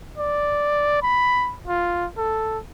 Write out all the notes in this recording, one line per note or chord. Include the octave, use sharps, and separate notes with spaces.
D5
B5
F4
A4